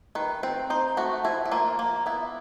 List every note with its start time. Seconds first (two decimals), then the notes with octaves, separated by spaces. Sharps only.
0.15 D#3 B4
0.43 C4 C5
0.70 D#4 C5
0.97 A3 F#4
1.24 F3 E4
1.45 E4
1.52 A#3 F4
1.79 A#3
2.06 B3 E4